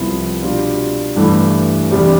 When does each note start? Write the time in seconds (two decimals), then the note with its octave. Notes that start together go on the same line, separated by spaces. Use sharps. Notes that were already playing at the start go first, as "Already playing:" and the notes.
Already playing: C2 C3 F3 B3 E4
0.42 B2 G3 D4 F4
1.16 G2 E3 A3
1.91 E2 C3 G3 D4 G4